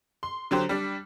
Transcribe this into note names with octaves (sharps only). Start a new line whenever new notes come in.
C6
D3 F#3 G4 C5
G3 D4